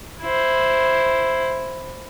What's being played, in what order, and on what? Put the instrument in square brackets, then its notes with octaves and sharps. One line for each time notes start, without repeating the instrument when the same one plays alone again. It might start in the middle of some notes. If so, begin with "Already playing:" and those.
[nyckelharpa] E4 C5